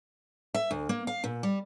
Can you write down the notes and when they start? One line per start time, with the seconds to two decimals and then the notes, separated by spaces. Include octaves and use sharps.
0.54 E5
0.71 D2
0.89 A#3
1.07 F5
1.24 A#2
1.43 G3